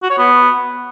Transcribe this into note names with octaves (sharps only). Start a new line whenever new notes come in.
F#4
C#5
B3